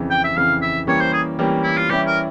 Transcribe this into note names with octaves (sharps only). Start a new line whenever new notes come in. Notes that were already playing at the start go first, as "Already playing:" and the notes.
Already playing: F2 C#3 E3
G5
E5
F2 C#3 E3 F5
E5
E3 G3 A#3 C#4 G4 C#5
C5
G#4
E3 G3 A#3 C#4 G4
E4
F4
E3 G3 C#4 E4 G4
A#4